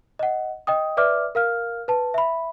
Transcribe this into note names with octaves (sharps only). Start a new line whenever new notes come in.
D#5 F#5
D#5 G5 D#6
B4 D5 E5 D6 F6
A#4 F5 F6
B4 A5
E5 B5